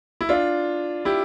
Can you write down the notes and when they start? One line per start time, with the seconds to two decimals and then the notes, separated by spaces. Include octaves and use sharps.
0.21 E4
0.29 D4 F4
1.05 E4 G4